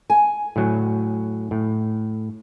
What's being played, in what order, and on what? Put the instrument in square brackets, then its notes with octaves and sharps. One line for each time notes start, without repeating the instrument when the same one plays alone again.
[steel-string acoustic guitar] G#5
[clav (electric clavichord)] A2 F#3
A2